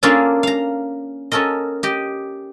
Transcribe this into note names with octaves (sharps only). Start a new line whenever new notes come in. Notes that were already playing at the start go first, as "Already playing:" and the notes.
A#3 C#4 D4 F4 G#4 A4
F5 A#5
C#4 F#4 A4 A#4 D#5
G4 D#5